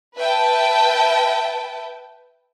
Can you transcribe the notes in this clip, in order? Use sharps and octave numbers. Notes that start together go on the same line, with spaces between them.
B4 E5 G5 A5